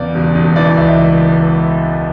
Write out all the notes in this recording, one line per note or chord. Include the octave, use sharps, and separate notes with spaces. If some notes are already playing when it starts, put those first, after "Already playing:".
Already playing: E2 C#3 D5
E1
E1
E3 D5
C#2 E5